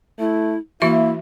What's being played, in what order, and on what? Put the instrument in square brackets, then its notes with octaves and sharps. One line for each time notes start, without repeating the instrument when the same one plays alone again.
[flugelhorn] A3 [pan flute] E4
[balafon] E3 F#4 E5 [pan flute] A#3 [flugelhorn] E4